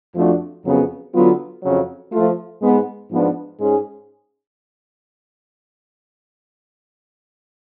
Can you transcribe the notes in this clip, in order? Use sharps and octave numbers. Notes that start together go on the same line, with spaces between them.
F2 F3 A3 D4 F#4
F2 C#3 F#3 B3
D3 F#3 B3 F4
F2 C#3 F#3
F3 A3 F4
G#2 G#3 B3
G#2 F3 B3 D4 F4
G#2 G#3 C#4 G#4